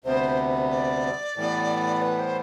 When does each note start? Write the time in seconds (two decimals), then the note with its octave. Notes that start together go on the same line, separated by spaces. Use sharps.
0.04 D2 C3 G3 B3 C5
0.71 D5
1.36 A2 E3 G3 B3
2.02 B4
2.20 C5